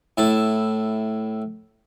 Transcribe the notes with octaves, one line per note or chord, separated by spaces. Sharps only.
A2 E4 A5